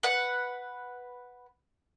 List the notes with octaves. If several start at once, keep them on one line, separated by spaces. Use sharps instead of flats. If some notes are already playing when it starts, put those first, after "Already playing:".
B4 F#5